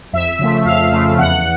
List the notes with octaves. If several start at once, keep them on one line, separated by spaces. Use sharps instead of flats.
F2 E5
C#3 F3 A3
F2 F5
C#3 F3 A3
E2 F#5